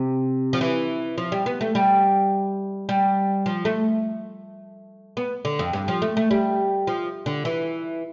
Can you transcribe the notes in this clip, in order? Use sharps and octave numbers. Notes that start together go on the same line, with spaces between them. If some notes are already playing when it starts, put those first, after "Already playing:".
Already playing: C3
F3
E3
F3
G3
B3
A3
G3
G3
F3
A3
B3
D3
F2
G2
F3
A3
A3
G3
F3
D3
E3